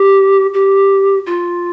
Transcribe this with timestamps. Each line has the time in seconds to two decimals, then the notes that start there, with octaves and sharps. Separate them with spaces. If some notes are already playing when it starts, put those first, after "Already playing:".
Already playing: G4
0.54 G4
1.26 F4